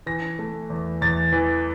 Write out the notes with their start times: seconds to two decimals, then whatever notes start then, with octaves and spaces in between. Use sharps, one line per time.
0.06 E3 A#6
0.39 A3
0.70 E2
1.02 E2 A6
1.32 E3